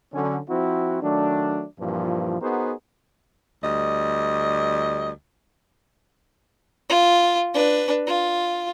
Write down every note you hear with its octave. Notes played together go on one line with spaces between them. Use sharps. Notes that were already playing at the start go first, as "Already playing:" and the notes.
D3 F#3 C#4
F3 C4 E4 F#4
D#3 F#3 A3 D4
G2 A#2 E3 F3
B3 D#4 F#4 G#4 A#4 C5
D2 G3 D#5
F4
D4 B4
F4